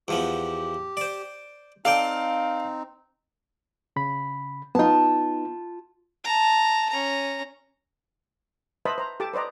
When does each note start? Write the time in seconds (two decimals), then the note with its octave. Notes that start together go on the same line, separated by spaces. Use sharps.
0.08 E2 F3 B3 G4
0.97 C5 D5
1.85 C4 D#4 A4 D5 F5 G5
3.96 C#3 B5
4.75 B3 D#4 F4 A5
6.24 A5 A#5
6.90 C#4 A#5
8.85 B4 C5 D#5 E5 A5 B5
8.98 C5 A#5
9.20 G4 A4 A5 D6
9.34 B4 C5 D5 D#5 A#5